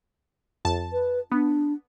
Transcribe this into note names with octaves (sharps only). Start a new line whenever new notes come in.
F2 A5
B4
B3 D4